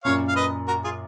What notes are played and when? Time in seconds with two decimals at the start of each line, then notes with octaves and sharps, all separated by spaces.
0.04 F#2 A#2 C#5 F5
0.28 F5
0.36 B4 D#5
0.68 F#4 A#4
0.84 F4 G#4